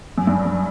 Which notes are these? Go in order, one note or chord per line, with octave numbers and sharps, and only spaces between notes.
F#2
G2
F#2